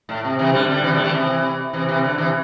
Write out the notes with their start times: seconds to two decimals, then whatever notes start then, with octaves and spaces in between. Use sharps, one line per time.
0.09 A2
0.25 C3
0.39 C3 E3
0.54 D3 G3
0.69 D3 G3
0.84 C3 E3
0.93 D3 G3
1.04 E3 A3
1.14 C3 E3
1.73 C3 E3
1.88 C3 E3
2.04 D3
2.18 C3 E3